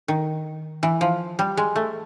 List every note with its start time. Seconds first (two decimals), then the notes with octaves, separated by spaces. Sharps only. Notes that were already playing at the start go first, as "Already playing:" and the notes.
0.08 D#3
0.83 E3
1.01 F3
1.39 G3
1.57 G#3
1.76 A3